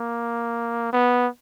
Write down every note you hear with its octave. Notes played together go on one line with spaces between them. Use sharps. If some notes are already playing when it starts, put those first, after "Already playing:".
Already playing: A#3
B3